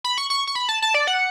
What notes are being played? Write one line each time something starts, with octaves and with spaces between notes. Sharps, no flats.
B5
C#6
C#6
C#6
B5
A5
A5
D5
F#5